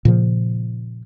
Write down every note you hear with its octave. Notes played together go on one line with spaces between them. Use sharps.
A#2 C#3 F3